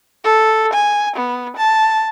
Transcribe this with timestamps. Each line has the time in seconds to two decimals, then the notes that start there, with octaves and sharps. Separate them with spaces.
0.24 A4
0.73 G#5
1.16 B3
1.57 A5